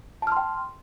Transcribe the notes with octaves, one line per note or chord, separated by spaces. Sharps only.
G5 A5 C6 F6